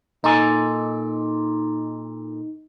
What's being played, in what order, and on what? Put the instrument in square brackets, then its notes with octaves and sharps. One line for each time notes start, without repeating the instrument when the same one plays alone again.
[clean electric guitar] A#2 A4 G#5 [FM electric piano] D#4